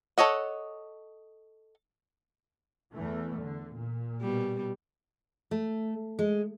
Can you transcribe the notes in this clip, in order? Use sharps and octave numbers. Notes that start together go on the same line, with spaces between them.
A4 C#5 D#5 F#5
E2 E3 A3
D3
A#2
B2 G3
A3
G#3